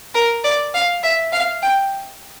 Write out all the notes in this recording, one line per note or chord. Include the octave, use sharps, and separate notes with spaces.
A#4
D5
F5
E5
F5
G5